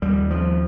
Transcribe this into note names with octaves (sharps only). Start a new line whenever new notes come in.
D#2 G3
F3